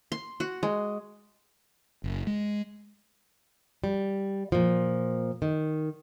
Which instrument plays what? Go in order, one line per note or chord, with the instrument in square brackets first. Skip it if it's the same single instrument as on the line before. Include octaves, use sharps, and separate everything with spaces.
[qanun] C6
F#4
G#3
[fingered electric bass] F#1
G#3
[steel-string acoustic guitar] G3
A#2 F3
D#3